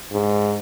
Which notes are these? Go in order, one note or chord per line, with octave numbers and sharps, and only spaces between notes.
G#2